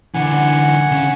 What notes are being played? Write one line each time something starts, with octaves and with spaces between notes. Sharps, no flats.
D3 E3 F#5 G#5
C#3 C#4